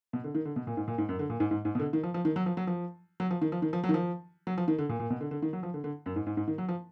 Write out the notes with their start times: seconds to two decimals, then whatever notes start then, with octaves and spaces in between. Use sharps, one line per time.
0.13 B2
0.24 D3
0.35 D#3
0.45 D3
0.56 B2
0.67 A#2
0.77 G#2
0.88 A#2
0.98 G#2
1.09 F#2
1.19 D3
1.30 A#2
1.40 G#2
1.51 G#2
1.65 G#2
1.75 B2
1.80 D3
1.93 D#3
2.03 F3
2.14 F3
2.25 D#3
2.36 F#3
2.46 F3
2.57 F#3
2.67 F3
3.20 F#3
3.31 F3
3.41 D#3
3.52 F3
3.62 D#3
3.73 F3
3.84 F#3
3.89 D#3
3.94 F3
4.47 F#3
4.58 F3
4.68 D#3
4.78 D3
4.89 A#2
5.00 A#2
5.10 B2
5.21 D3
5.31 D3
5.42 D#3
5.53 F#3
5.63 F3
5.74 D3
5.84 D3
6.06 F#2
6.16 G#2
6.26 G#2
6.37 G#2
6.48 D#3
6.58 F#3
6.69 F3